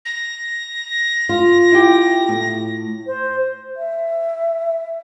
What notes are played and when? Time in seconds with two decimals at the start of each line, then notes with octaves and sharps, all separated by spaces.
0.05 A#6
1.29 F4
1.72 E4 G4
2.29 A2
3.07 C5
3.77 E5